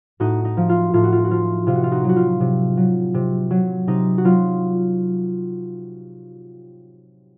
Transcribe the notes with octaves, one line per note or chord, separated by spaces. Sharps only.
A2 D#4 F#4
D#4
F3
F4
A2 F4
F#4
F4
F#4
F3 F4
C3 F4
F#4
F4
D#4 F#4
F#3
F#4
F4
C3
F#3
C3
F#3
C3 D#4
F#4
F#3 F4